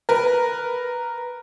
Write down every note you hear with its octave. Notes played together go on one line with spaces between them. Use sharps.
A#4 B4